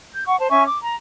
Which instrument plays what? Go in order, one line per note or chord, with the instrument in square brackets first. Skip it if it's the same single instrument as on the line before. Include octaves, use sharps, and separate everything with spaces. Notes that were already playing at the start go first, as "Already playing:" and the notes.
[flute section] G6
F#5 C#6
C5 A5
C#4 E5 G#5 C#6
D6
A#5